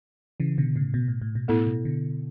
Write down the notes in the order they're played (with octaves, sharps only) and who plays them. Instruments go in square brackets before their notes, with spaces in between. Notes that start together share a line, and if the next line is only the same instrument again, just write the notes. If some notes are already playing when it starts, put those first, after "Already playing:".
[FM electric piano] C#3 E3
B2 D3
A2 C#3
B2
A2
A2
B2
[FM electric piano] A2 [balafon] B3 E4 A4
[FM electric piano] B2
B2 D3